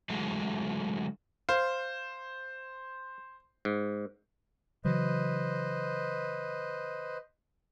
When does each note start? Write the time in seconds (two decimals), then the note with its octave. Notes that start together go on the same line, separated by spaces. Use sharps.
0.09 D3 E3 F#3 G#3 A3
1.49 C5 F5
3.65 G#2
4.85 C#3 E3 F#3 B4 C5 D#5